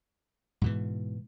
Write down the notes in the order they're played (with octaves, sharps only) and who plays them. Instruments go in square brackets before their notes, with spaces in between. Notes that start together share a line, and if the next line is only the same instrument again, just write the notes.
[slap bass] G#2 B2 E3